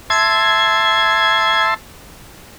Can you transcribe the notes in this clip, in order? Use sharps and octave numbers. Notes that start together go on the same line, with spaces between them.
E5 A5 C6 G#6